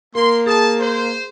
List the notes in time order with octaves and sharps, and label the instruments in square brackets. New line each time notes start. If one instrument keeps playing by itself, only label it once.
[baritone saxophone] A#3 [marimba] A#4 [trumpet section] C6
[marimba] G#4 D#6 [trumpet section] A5
[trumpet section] C5